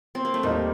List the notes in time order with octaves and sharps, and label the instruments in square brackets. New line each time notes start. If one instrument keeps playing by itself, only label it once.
[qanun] C4
A#3
A3
[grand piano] D#2 D#3 A#3 D#4 A#4 [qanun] G3